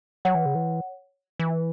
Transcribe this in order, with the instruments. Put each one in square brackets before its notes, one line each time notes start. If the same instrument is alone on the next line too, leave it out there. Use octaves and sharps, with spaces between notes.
[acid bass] F#3 [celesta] C#5 F#5
[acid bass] E3
C#3
E3
E3